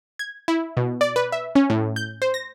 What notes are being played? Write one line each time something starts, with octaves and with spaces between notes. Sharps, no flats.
G#6
E4
B2
D5
B4
E5
C#4
A2
G6
C5
A#6